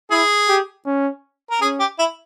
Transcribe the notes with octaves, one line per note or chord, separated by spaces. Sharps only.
E4 G#4
G4
C#4
A#4
C#4 G#4
G4
E4